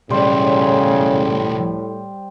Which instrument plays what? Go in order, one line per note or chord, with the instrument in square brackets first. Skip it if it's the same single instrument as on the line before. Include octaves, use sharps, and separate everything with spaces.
[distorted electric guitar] B1 E3 [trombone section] A2 [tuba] C#3 [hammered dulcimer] G3 C5